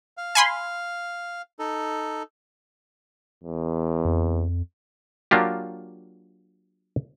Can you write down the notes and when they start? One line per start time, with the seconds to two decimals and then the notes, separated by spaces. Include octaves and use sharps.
0.17 F5
0.35 G#5 B5 C6
1.59 D#4 A4
3.44 E2
4.05 F2
5.31 F#3 A#3 D4 F4 G4